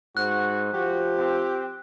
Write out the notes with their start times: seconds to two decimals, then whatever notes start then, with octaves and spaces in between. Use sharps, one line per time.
0.17 G#2 F#4 F#6
0.74 F3 F#4 G4
1.17 C4